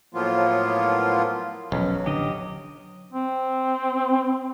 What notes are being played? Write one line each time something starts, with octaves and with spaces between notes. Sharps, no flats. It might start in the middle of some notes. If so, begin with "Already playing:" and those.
A2 F3 F#3 A#3 B3 F4
E1 B1 F3 F#3 C#4
A1 D3 D4 G4 D#5
C4